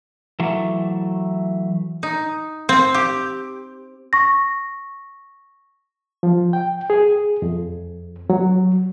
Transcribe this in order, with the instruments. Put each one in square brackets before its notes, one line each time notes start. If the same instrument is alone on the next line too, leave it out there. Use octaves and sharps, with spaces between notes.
[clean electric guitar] E3 F#3 A3
[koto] D#4
C4
G4
[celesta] C#6 A#6
[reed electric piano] F3
G5
G#4
F2
F#3